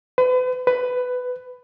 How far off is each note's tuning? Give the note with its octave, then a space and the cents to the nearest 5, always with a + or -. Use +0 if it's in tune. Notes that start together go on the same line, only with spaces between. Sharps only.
B4 +40
B4 +15